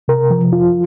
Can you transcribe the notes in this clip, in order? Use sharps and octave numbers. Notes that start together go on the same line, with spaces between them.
C3 A#4
F3
F2 F4